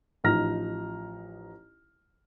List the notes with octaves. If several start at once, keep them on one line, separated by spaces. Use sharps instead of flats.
A1 F3 D#4 A#5 F6 A#6